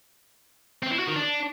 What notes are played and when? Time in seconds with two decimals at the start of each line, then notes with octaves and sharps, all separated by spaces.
0.83 C4
0.91 E4
0.99 F#4
1.08 D#3
1.16 D4